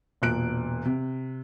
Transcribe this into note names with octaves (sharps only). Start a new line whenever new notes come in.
E1 A#2 F#6 D7
C3